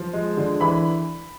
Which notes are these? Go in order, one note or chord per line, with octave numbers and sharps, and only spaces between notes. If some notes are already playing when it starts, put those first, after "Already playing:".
Already playing: F3
G#3
D3
E3 B5